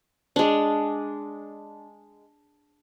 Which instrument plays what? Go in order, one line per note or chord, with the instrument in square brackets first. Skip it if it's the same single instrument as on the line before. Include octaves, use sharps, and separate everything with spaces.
[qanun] G#3 D4